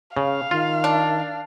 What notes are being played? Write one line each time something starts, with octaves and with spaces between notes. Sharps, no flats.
C#3 F5
D#3 F4
D4